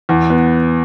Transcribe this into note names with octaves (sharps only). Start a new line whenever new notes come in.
E2
B3